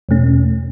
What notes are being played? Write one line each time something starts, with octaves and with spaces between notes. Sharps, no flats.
E2 B2 A3 C#4